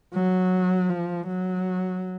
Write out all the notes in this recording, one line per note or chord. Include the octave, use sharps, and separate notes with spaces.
F#3
F3
F#3